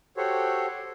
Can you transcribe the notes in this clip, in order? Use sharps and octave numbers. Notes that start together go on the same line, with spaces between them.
F#4 G4 A4 C5 C#5